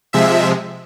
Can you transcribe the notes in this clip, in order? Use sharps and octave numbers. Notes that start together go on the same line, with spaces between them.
C3 F3 G#3 E5